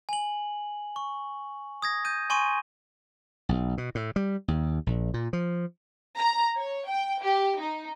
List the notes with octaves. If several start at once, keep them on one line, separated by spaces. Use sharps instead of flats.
G#5 F#7
C#6
D#6 G#6 A#6
G6 D#7
G#5 C6 C#6 D#7
B1
B2
A2
G3
D#2
A#1
A#2
F3
A#5
C#5
G5
G4
D#4